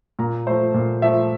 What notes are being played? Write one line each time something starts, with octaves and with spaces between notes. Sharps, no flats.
A#2 A#5
F3 A3 C5
A#2
F3 A3 E5